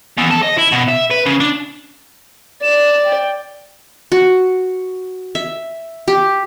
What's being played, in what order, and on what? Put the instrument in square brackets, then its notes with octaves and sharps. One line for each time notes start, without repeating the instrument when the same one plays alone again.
[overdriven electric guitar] E2
A4
D#5
E4
B2
E5
B4
C#3
D4
[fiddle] D5 [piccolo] E7
[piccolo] G5
[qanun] F#4
E5
G4